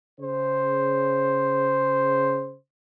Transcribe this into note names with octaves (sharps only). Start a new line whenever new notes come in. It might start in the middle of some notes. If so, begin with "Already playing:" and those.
C#3 C5